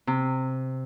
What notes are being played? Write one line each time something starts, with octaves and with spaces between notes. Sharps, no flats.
C3